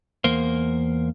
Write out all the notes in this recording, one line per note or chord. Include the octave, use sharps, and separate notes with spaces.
E2 A#3 A#4 C5